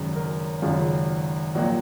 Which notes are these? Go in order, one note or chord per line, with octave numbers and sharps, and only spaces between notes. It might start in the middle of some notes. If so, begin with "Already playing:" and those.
Already playing: G#1 F#2 C#3
A#4
G#1 F#2 C#3 F4
A#1 A#2 F#3 A#3 F#4